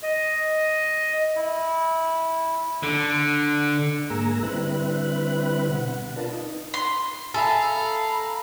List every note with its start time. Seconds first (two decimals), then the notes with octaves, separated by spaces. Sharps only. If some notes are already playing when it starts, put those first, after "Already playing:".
0.03 D#5
1.36 E4
2.83 D3
4.10 G#2 A#3 G#4 A#5 E6
4.43 D3 G3 C4 E4 B4 F#6
5.69 B2 F#5
6.16 D4 F4 A#4 B4 A5
6.31 D#4
6.74 C6
7.34 G#4 A4 E5 F5 A#5 B5